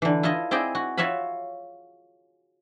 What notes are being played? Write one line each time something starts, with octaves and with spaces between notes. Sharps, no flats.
D3 E3
E4 F4 A4 D#5
C4 E4 G#4 D5 D#5 G5
F#4
F4 F#4 C#5 E5 F5 B5